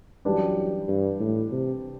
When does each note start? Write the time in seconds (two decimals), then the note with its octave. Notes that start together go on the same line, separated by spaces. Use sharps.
0.25 F#2 E3 G3 D4 G4 B4
0.88 G2
1.19 A2
1.52 C3